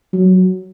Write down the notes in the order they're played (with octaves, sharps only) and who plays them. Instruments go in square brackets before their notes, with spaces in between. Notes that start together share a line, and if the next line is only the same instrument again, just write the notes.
[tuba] F#3